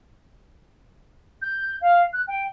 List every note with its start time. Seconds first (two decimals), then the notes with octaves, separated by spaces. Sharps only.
1.42 G6
1.81 F5
2.13 F#6
2.28 G5